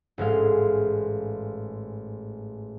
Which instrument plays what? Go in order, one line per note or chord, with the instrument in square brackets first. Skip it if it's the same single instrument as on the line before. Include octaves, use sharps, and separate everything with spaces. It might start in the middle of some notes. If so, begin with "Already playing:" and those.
[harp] A1 G#2 G#3 F5